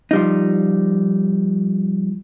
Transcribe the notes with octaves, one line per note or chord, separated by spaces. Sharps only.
F3 G3 D#4